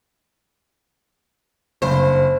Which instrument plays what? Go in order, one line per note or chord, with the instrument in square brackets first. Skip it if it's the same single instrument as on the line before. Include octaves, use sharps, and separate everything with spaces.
[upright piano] F#1 G2 [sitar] C5